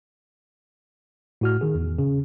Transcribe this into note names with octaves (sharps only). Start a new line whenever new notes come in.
A2 F#4 F6
D#3 G#4
E2
C#3